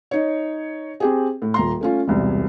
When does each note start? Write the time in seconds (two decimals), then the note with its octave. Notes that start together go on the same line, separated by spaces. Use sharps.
0.11 D#4 C#5
1.00 C4 G4 G#4
1.42 A2
1.54 D#1 A#5 C6
1.81 A3 C#4 F4
2.08 E1 C2 C3